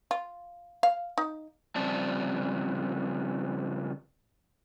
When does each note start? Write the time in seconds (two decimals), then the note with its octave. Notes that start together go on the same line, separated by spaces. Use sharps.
0.11 F4
0.83 F5
1.18 D#4
1.76 C#3 F3 G3 C4 D5 A5